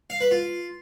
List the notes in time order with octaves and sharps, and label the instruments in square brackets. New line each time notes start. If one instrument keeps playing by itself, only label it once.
[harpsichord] F5
B4
F4